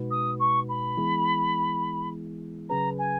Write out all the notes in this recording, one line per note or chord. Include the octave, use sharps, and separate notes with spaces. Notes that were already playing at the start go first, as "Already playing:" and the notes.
Already playing: B2 G#3 D#4 F#4 B4
D#6
C#6
B5
E3 G#3 B3 E4 G#4
C#3 F#3 C#4 G#4 B4 A#5
G#5